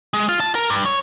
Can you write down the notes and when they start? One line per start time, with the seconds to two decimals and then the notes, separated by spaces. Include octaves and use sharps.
0.14 G#3
0.29 F4
0.40 A5
0.55 A#4
0.70 G2
0.86 C#5